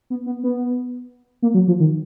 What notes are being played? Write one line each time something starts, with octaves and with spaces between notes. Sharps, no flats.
B3
B3
B3
A#3
F#3
F3
D#3